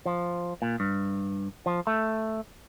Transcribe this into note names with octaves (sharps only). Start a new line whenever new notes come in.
F3
A#2
G2
F3
A3